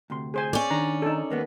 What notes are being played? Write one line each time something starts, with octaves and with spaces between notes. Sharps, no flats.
D2 C3 C6
G#4 C5 G#5
C#4 D5
D#3 D4 A#5
D#4 A4
D#2 A#3 B3